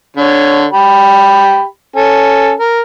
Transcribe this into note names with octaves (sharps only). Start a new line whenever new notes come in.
D3 C#5
G4 B5
C#4 A4
A#4